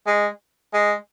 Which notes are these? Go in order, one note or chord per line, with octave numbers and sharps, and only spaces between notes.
G#3
G#3